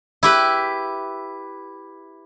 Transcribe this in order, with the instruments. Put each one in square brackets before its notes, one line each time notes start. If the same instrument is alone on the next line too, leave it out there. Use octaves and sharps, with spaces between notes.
[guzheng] E4 G4 B4